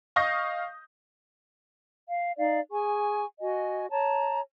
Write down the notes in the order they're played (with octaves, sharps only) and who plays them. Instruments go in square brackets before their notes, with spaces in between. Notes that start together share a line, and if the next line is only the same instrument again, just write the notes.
[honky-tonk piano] D#5 F5 C#6 D#6 G6 A#6
[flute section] F5
D#4 D5 F5
G#4 G#5 C#6
F#4 D#5 G#5
C#5 A5 A#5